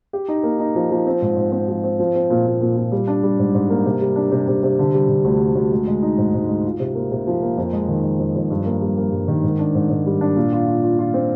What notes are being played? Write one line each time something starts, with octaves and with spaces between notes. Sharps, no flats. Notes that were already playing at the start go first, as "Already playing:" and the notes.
G4
D#4
A#3
D#4
F3
F3
C4
G#2
G#2
C4
F3
C4
F3
C4
A#2
A#2
A#2
A#2
G3
D4
G3
G#2
G#2
A#3
C3
G3
D4
C3
C3
C3
D3
G3
D3
D2
G3
D2
G#3
G#3
D#4
G#2
G#2
G#3
F4
C3
A#3
C3
F3
A#3
F2
G#3
D#3
G#3
F2
F2
G2
A#3
G3
A#3
G2
D#3
G#2
D4
G#2
G#2
G3
D4
A#2
F4
F4
F4
F4
C4